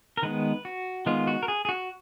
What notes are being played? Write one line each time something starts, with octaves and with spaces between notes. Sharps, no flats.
A#4
D#3 G#3 B3 B4
F#4
D#3 G#3 B3 F4
F#4
A#4
G#4
G#4
F#4